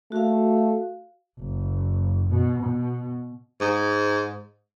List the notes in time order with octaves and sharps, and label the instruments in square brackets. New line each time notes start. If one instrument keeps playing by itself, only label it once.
[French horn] A3 [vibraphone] F#4 F5
[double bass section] F#1
B2
B2
[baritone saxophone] G#2